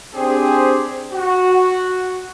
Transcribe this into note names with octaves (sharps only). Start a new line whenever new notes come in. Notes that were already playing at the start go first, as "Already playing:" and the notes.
C4 D4 G4 G#4 C5
F#4